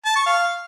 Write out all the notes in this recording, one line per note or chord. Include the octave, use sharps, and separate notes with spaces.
A5
C#6
F5